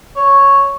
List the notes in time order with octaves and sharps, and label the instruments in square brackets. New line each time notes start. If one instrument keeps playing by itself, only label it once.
[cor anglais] C#5